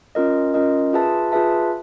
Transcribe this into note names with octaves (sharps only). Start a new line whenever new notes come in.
C#4 F4 A#4 D#5
C#4 F4 A#4 D#5
F4 G#4 B4 E5 A5
F4 G#4 B4 E5 A5